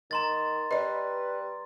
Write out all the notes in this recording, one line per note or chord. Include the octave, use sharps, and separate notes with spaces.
D#3 A#5 C6 A6
G3 B4 D5 D#5